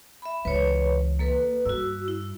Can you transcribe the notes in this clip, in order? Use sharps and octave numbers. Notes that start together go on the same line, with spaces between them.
E5 B5
C#2 E3 B4 C#5
A#3 A4 B4
G2 F#4 E6
E4